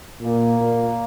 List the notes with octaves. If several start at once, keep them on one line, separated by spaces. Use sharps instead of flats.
A#2 A#3
A#2